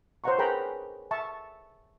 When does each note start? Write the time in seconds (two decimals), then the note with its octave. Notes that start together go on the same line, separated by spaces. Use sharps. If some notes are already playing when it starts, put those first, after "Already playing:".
0.24 C5 C#5 D#5 F#5 A#5 C#6
0.38 G#4 A#4 B4 G5 A#5 B5
1.11 E5 A5 C#6